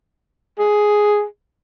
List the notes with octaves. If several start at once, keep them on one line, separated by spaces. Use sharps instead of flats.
G#4